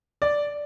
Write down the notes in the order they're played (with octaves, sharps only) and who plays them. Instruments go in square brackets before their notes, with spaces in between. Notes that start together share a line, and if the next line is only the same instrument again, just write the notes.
[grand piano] D5